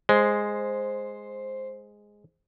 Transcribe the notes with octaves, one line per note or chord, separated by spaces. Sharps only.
G#3 C5